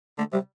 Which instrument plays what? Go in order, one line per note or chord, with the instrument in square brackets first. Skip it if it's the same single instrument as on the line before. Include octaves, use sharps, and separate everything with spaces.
[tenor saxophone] D3 [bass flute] A3
[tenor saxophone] C3 [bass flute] G3